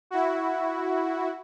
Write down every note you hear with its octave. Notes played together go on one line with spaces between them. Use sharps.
E4 F#4